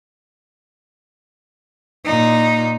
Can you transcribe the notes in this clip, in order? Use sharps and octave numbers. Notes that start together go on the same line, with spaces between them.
A#2 D#4